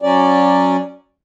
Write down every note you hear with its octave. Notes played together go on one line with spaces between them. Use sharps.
F#3 C#4 D5